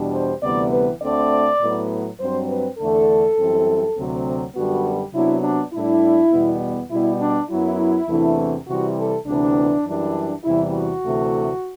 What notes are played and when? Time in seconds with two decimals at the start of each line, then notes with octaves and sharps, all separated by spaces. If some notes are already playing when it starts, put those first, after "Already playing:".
Already playing: E2 B2 G3 D4
0.13 C5
0.43 D2 C3 E3 G3 B3 D5
0.72 B4
1.02 D2 D3 A3 C4 D5
1.61 A2 F#3 B3
2.20 G2 F#3 C4 C5
2.49 B4
2.79 E2 D3 A3 D4 A4
3.38 F#2 E3 G3 C4
3.97 D2 C3 F#3 C4
4.55 F#2 D3 G3 B3 F#4
5.14 C3 F#3 B3 D4 E4
5.44 D4
5.74 A2 G3 D4 E4
6.32 E2 B2 G3 B3
6.91 B2 G3 B3 E4
7.21 D4
7.50 F#2 F#3 B3 E4
8.08 E2 C3 E3 A3 D4
8.67 C3 E3 G3 F#4
8.97 A4
9.27 D2 C3 E3 B3 D4
9.86 F#2 E3 G3 D4
10.44 E2 C3 E3 G3 B3 E4
10.74 F#4
11.04 D2 C3 E3 A3